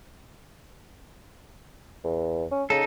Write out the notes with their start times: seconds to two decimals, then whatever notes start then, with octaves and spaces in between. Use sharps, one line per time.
2.04 E2
2.52 C#4
2.70 C#3 D#4 A4